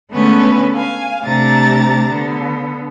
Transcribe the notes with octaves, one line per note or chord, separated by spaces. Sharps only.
D3 G#3 A3 B3 C#4 B4
F5 G#5
C3 A3 D4 G4 A#5 A6
D3 B3